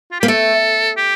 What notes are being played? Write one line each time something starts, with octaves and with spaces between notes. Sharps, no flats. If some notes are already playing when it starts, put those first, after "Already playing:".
F4
A#3 G4
A3 A4
G4